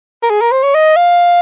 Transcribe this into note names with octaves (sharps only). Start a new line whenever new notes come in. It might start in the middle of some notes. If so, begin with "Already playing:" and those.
A#4
G#4
A#4
C5
C#5
D#5
F5